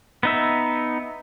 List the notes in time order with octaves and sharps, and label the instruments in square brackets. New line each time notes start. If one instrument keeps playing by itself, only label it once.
[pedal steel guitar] B3 D#4 E5